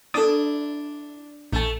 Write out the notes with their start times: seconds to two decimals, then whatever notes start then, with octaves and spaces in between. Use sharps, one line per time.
0.14 D4 E4 A4 D6 D#6 A6
1.52 A#1 A3 A5